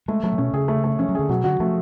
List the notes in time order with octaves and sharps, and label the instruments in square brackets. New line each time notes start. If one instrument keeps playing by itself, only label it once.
[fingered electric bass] G#3 [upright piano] A3
[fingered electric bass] F#3 [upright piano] A3
[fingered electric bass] C#3
[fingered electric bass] B2 [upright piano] C#4
[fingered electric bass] C#3 [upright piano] G#4
[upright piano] A3
A3
[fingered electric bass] F3 [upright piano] C#4
[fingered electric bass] F#3
[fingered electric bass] D3 [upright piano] G#4
[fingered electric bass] B2 [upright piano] F#3
[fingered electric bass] D3 [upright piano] F#4
[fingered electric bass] F3 [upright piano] A3